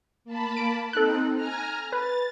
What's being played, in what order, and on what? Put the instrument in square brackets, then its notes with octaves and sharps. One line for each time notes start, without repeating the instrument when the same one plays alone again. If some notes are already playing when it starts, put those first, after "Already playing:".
[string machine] A#3 A5 B5
[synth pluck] D7
[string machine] C4 D#4 [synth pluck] A4 F#6
[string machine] G#5 A#5 F6
[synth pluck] B4 [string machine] A6